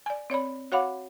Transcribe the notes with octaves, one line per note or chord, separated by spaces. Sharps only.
D5 G#5
C4 C#5 D5 B5
F#4 C#5 F5 F#5 B5 D6